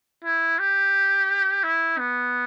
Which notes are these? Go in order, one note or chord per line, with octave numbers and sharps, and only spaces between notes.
E4
G4
E4
B3